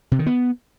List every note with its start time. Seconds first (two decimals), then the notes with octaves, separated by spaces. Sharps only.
0.12 C3
0.19 D#3
0.26 B3